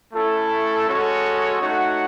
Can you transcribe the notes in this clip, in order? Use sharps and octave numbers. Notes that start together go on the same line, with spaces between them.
A3 C#4 E4 A4
G#3 C#4 F#4 A4 C#5
A3 D#4 F#4 C#5 F#5